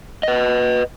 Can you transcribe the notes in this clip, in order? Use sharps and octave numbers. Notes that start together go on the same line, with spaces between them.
B4 D#5